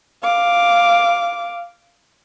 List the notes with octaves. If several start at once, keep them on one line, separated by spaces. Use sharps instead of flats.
F5 D6